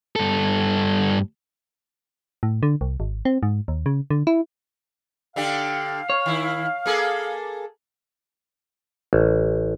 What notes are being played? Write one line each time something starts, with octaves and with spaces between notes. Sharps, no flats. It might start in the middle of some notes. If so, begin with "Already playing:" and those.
G2 A4
A2
D3
C2
G#1
C4
G#2
D#2
C#3
D3
E4
D3 D4 G4 F5
C#5
D#3 E4
A#3 G#4 A4
A1